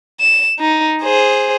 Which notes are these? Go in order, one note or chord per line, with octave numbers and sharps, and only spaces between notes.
E7
D#4
G#4 C5